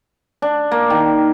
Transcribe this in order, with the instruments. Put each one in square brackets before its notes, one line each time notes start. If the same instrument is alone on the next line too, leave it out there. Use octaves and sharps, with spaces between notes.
[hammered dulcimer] D4
A#3
D#3